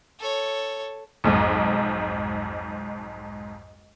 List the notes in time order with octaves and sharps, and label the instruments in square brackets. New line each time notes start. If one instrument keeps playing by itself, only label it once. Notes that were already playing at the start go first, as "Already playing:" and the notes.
[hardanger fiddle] A4 C#5
[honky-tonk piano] B1 F2 G#2